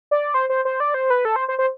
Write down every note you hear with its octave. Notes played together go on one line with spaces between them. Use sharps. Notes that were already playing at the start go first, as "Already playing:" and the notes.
D5
C5
C5
C5
D5
C5
B4
A4
C5
C5
C5